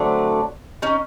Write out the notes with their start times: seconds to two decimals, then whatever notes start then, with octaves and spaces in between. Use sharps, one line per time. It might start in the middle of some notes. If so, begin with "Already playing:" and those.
Already playing: D3 F#3 A3 C4 D4
0.82 C#4 D#4